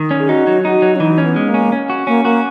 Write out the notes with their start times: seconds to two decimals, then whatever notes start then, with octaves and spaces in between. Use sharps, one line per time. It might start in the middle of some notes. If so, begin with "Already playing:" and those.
Already playing: D#3
0.11 C#4
0.19 G#4
0.29 D#4 F#4
0.47 F#3
0.64 D#4 F#4
0.82 F#3
0.96 C#4
1.00 E3 D#4
1.18 C#4
1.24 B3
1.36 G#3
1.48 A#3
1.54 C#4
1.72 C#4
1.90 F#4
2.07 A#3 C#4
2.25 A#3 F#4